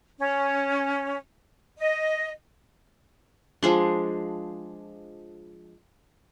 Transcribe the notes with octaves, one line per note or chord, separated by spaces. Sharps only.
C#4
D#5
F3 G#3 D4